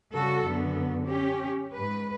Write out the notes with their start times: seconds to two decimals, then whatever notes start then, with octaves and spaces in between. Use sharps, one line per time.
0.15 C#3 G3 F#4 A4
0.47 F#2 D3 B3
1.06 C#4 G4
1.73 G#2 B4